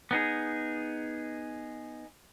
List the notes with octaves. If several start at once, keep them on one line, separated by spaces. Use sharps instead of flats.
B3 D#4 G#4